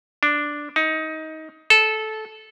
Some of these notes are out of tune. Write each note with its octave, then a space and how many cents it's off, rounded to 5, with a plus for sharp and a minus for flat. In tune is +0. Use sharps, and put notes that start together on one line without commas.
D4 +0
D#4 +20
A4 -15